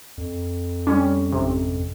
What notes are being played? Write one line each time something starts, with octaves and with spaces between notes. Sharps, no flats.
F2
G3 C#4
G#1 C3